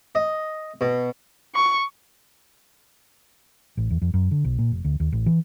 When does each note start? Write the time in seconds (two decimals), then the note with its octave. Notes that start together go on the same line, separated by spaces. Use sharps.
0.15 D#5
0.81 B2
1.55 C#6
3.77 A1
3.90 E2
4.02 F2
4.14 F#2
4.31 D3
4.45 B1
4.59 A#2
4.72 F1
4.85 D2
5.00 D#2
5.12 A1
5.26 E3